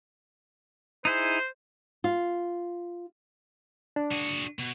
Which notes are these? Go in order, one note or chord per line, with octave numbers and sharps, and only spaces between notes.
D#4 E4 G#4 C5
F4
D4
F#4 G#4
B2